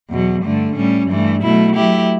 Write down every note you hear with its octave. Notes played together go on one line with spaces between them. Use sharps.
E2 B2 F#3
G2 D3 A3
A2 G3 C#4
G2 E3 A3
B2 F#3 A3 E4
F#3 A3 E4 G4